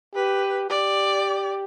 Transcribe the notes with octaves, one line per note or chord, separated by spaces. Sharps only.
G4 B4
G4 D5